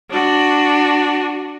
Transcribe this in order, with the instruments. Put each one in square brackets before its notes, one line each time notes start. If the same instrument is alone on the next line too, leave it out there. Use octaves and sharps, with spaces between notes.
[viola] D4 F#4